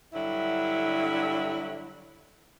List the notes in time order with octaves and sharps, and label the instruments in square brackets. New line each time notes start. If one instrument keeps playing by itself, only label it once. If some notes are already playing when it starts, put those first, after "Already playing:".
[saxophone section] G2 D3 F#3 E4